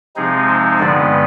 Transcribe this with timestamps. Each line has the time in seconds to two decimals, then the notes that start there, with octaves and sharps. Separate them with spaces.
0.16 C3 F3 G#3 C4 D#4 G#4
0.48 C5
0.79 G2 D3 G#3 B3 D5